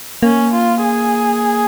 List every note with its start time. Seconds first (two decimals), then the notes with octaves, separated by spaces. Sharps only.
0.23 A#3 C#4
0.54 F4
0.83 G#4